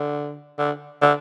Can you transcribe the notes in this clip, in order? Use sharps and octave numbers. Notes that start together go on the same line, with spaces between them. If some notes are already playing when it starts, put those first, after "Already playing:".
Already playing: D3
D3
D3